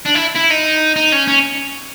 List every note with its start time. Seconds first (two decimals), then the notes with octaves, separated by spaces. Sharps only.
0.06 D4
0.15 E4
0.36 E4
0.51 D#4
0.96 D#4
1.12 C#4
1.28 C#4